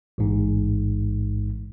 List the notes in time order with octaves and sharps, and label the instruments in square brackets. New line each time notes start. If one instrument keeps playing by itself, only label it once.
[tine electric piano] A1 G#2